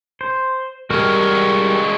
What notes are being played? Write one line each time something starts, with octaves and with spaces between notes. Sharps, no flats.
C5
G3 G#3 F#4 A#4 F6